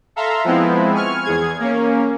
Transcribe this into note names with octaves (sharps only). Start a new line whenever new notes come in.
A4 E5 F5 A#5 C6
F3 G#3 B3 C4 E4
G#5 C#6 F6
E2 G#4 G#6
A#3 C#4